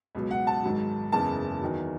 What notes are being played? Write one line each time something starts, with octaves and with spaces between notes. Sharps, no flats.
C#2 B2 F#3
F#5
A5
G#1 G#2 F#3
F#1 E2 C#3 A5
E2 D#3 F#3